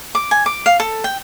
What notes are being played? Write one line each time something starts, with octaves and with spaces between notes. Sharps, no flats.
D6
G#5
D6
F5
A4
G5